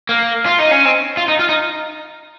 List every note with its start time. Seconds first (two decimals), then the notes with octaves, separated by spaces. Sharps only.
0.09 A#3
0.46 F4
0.59 D#4
0.71 C#4
0.85 C4
1.17 F4
1.28 D#4
1.39 F4
1.49 D#4